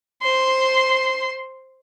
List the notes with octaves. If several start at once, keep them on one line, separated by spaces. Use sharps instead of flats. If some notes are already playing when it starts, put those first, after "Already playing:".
C5 C6